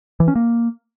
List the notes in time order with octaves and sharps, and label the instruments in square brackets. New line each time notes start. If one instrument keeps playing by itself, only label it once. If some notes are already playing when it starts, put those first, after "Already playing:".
[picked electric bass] E3
C#4
A#3